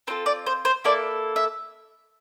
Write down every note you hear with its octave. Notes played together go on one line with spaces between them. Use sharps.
C4 F4 A4 C5
D5
C5
C5
A#3 E4 A4 D5
E5